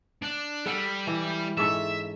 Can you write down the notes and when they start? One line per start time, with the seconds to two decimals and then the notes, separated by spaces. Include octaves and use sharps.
0.22 D4
0.66 G3 A4 F#5
1.07 E3
1.58 G#2 C#4 A4 E5